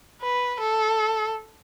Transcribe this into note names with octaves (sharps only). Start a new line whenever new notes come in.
B4
A4